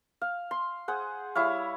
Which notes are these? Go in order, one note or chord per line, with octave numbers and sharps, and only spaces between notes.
F5
C6
G#4 C5 F#5
G3 E4 C#5 F5